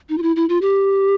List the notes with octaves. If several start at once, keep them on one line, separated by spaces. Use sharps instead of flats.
D#4
F4
E4
E4
F4
G4